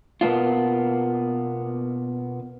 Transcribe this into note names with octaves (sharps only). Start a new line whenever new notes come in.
B2 A#3 B3 D4 F4